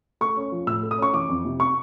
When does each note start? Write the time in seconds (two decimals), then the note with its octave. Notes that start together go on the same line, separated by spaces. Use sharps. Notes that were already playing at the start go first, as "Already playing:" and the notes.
0.21 A3 C#6
0.37 C#4
0.52 F3
0.67 A2 E6
0.83 A3
0.91 D#6
0.98 C#4 C#6
1.14 E3 D6
1.29 F2
1.45 C3
1.60 C#6